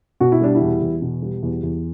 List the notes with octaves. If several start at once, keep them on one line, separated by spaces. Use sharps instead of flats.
B2 F#4
E4
G3 D4
E4
E2
E2
B2
G3
E2
E2